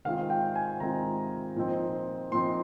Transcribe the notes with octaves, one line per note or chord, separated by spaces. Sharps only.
C3 D#3 G#3 C4 F4 F5
G5
G#5
C3 D#3 G#3 C4 F4 A#5
A#2 F3 C4 D#4
A#2 F3 C4 D#4 C6